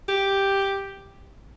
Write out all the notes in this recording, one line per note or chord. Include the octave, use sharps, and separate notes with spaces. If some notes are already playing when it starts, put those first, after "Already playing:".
G4